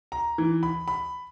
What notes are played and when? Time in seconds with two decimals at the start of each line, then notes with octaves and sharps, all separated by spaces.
0.12 A#5
0.38 E3
0.63 B5
0.88 B5